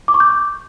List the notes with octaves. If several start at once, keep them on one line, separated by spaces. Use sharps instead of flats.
D6
C#6
G6